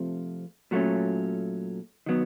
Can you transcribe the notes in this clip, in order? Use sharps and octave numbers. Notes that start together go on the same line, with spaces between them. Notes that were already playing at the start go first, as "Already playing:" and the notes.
Already playing: C3 F3 A3
A#2 F#3 A3 C#4
D#3 F#3 B3